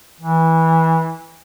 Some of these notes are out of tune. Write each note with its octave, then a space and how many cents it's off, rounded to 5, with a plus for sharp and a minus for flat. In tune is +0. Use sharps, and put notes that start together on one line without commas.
E3 -20